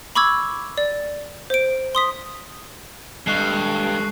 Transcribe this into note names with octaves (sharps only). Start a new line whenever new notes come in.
B5 C#6 D6 E6 G#6
D5
C5 D7
C6 D#6 B6
G2 G#3 A4 D#5 C#6 F#6 C7